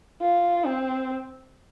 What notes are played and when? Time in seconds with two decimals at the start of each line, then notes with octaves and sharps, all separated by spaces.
0.21 F4
0.66 C4